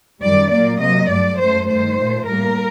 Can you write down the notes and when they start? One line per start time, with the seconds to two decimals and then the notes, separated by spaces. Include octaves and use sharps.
0.22 F#2 D#3 G3 D5
0.52 A#2 F#3 A#3 D5
0.81 C3 F#3 A#3 D#5
1.10 G2 F#3 A3 D5
1.38 F#2 F#3 A3 C5
1.68 G2 D#3 A3 C5
1.97 A#2 A3
2.27 A2 G3 A#3 A#4